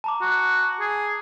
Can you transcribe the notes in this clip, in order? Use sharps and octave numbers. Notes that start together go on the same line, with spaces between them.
A5 A#5 D6
F#4
G#4